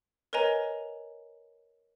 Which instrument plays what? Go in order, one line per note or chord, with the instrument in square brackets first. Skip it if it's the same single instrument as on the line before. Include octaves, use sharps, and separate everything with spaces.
[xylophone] A#4 B4 C#5 D#5 G#5 A#5